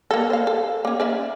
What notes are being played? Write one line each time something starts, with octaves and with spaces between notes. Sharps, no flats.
A#3 A4
C5 F5
A4
A#3 C#4
A#4 D5 E5